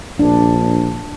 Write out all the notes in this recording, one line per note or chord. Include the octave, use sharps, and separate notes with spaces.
A#1 D4